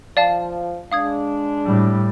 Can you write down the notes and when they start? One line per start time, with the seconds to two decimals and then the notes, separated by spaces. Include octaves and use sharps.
0.17 F3 D5 F5 A5
0.92 G#3 D4 F5 D#6 G#6
1.65 A2 G3